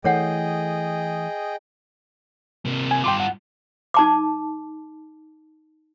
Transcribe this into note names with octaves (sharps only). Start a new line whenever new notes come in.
E3 A3 G#4 A4 C#5 D#5 F#5 G5
C3 A#3
G#5
G2 F4 G5 C6 D6
F#5
D#4 A5 D6